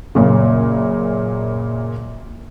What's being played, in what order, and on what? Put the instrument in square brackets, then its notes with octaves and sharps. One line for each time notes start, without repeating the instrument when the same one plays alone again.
[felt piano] F#2 A#2 C#3